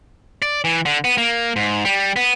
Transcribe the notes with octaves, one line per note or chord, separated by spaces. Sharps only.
D5
E3
D3
B3
A#3
G#2
G3
B3